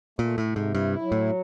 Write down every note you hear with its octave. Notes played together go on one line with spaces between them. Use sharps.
A#2 A3
A2
C3
G#2
G2 E4
F#3
A2